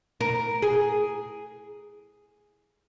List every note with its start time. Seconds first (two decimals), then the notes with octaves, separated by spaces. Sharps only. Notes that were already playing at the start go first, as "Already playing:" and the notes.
0.21 A#4
0.62 G#4